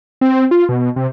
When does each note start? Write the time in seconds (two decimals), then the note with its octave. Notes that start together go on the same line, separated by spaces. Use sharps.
0.21 C4
0.51 F4
0.69 B2
0.96 C3